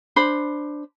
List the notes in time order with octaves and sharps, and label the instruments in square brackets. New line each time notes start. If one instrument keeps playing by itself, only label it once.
[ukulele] D4 C5 B5